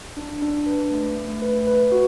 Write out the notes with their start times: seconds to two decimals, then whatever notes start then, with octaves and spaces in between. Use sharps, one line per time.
0.17 D4
0.42 D4
0.66 B4
0.91 A3
1.16 A3
1.42 B4
1.67 B4
1.92 F#4